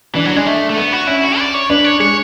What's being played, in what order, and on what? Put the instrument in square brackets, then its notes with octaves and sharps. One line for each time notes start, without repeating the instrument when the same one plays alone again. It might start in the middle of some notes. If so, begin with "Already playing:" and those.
[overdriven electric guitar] E3 [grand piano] D4
[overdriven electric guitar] F#3
[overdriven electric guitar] G#3 [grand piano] D4
[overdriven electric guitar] A3
A3
B3
F#4
[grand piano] C#4 [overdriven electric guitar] E4
[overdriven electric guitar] F#4
D5
C#5
[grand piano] D4 [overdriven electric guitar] B4
[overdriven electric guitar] C#5
[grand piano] G#3 [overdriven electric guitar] C#5